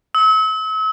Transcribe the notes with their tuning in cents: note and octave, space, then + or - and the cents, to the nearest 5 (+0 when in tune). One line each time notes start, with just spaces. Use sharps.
E6 -40